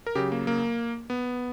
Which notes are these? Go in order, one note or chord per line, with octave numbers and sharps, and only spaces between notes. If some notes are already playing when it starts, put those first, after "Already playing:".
A#4
C#3 F#3 G4
A#3
A#3
B3